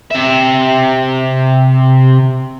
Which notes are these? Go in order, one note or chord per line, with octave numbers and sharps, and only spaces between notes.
C3 E5